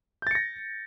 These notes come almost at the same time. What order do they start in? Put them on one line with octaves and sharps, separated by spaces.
G6 A6 C#7 A#6